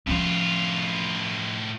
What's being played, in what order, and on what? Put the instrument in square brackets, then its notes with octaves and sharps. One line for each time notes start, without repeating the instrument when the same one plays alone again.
[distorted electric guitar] A2 F4 [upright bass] F3 C#4